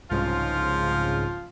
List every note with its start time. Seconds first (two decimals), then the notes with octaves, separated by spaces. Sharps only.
0.10 C2 G#2 C#3 F3 F4